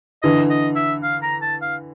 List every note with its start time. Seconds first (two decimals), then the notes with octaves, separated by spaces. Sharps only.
0.23 D3 E3 D#5
0.50 D#5
0.76 E5
1.03 F5
1.23 A#5
1.42 A5
1.62 F5